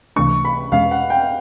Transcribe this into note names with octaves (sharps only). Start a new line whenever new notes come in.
C#2 C3 E3 A3 D4 C#6
B5
E2 B2 G#3 C#4 F5
F#5
G5